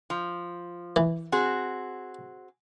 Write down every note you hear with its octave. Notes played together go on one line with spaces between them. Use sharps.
F3
E3
C4 F#4 G#4